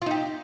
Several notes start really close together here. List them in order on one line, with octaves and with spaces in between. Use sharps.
F4 D#4 G4